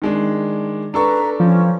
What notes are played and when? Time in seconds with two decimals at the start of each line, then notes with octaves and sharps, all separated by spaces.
0.02 D#3 G#3 D4
0.94 D4 A4 B4 A#5 C#6
1.40 F3 C#4